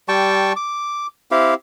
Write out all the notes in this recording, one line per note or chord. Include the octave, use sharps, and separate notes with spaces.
G3 G5 A5 C#6
D6
C4 E4 G4 F5